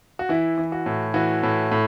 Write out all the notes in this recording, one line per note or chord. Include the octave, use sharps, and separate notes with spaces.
F#4
E3 E4
E3
F#4
A2
E3 F#4
A2
A2